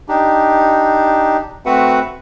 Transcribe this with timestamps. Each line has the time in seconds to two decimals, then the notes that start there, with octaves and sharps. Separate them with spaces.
0.09 D4 D#4 G4
1.66 A3 C4 F#4 B4 E5 F#5